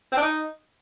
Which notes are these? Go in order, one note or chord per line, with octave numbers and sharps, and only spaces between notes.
C4
D4
D#4